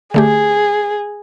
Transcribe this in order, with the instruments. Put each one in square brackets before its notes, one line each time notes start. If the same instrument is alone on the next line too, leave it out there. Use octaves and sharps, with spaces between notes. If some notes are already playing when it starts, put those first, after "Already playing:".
[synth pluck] D3 A3 G4 [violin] G#4